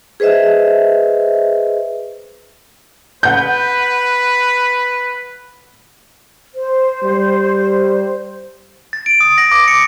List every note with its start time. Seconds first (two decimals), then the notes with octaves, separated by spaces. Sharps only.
0.20 G#4 B4 C5 D#5 E5
3.23 B4 F#5 G6
6.55 C5
7.03 G3
8.93 A6
9.06 D7
9.21 D#6
9.38 A#6
9.52 D6
9.68 C#7